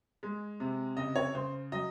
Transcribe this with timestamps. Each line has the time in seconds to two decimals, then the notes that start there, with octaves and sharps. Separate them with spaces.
0.23 G#3
0.60 C3
0.97 C#3 D#5
1.16 C#5
1.34 C#3 C5
1.72 F#3 D#5